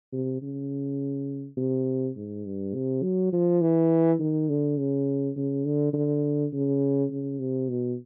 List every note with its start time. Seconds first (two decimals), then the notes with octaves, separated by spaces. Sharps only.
0.12 C3
0.42 C#3
1.57 C3
2.16 G#2
2.45 G2
2.74 C3
3.03 F#3
3.33 F3
3.61 E3
4.19 D#3
4.49 D3
4.78 C#3
5.36 C#3
5.65 D3
5.93 D3
6.53 C#3
7.11 C#3
7.39 C3
7.69 B2